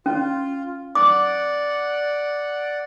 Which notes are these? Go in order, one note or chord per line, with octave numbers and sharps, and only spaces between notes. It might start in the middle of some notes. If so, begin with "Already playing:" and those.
C#4 F4
D5 F#5 D6